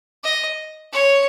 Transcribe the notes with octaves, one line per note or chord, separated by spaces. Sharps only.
D#5
C#5